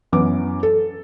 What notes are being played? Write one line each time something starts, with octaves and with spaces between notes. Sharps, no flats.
F#2 E3 B3 D6
A4